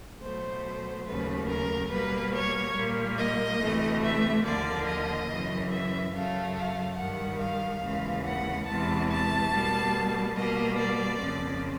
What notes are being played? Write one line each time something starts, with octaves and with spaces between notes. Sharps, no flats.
B2 F#3 A3 C5
D#2 C#3 F#3 A3 B4
A#4
B2 G3 A#3 B4
C#5
A#2 G3 A#3
D#5
D2 C3 E3 A3
E5
D#2 D3 F3 A#3 D5
D#5
F#2 C#3 E3
E5
F#2 C#3 F#3 A3 F5
F5
G2 D#3 G3 F#5
F5
D#2 C#3 E3 G#3
F#5
E2 C3 E3 G#3 A5
A5
B2 G3 A#3
B2 G3 A#3 D#5
D5
F2 C#3 F3